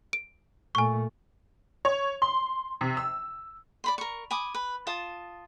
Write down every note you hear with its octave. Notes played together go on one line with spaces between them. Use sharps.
D7
A#2 A3 G#5 C#6
C#5
C6
C3
E6
D5 B5 C6
A#4 C#6
G#5 B5 D6 D#6
B4
F4 A5 D#6